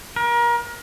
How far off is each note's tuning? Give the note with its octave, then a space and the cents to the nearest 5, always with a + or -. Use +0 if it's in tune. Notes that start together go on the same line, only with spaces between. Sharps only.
A#4 +30